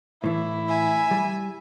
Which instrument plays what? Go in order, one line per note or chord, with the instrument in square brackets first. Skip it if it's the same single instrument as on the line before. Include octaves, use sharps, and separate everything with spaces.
[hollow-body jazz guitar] A2 E3 [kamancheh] E4
[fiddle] E5 G#5
[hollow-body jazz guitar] G3